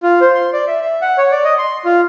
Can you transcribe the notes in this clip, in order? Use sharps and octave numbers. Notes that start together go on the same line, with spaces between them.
F4
C5
C6
D5
E5
E5
F#5
C#5
D5
D#5
C6
F4